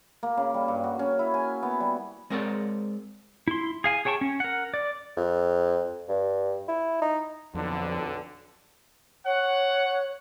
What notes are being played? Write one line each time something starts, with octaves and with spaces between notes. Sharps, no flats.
A#3
C#3
G3
G2
F#4
C#4
E4
G#5
B3
G3
G#3 C4 A#4 C#5 D5
E4 C6
G#4 F5 G#5
G#4 C#5 G5 A5 C#6
C#4
A#4 F#5
D5
F2
G2
E4
D#4
B1 F2 D3
C#5 F#5